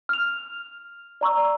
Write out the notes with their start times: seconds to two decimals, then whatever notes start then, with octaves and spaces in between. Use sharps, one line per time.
0.09 F6 F7
1.21 D5 A#5 C#6 E6